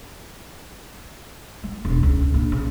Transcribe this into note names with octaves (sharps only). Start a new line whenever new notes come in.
G#3
E1
C#2
A#1
C#3